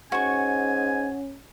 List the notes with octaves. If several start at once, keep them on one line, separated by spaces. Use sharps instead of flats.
G#2 C#4 F#4 G#5 C#6